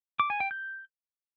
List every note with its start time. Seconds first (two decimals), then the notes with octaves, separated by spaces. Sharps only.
0.20 D6
0.30 G#5
0.40 G5
0.51 G6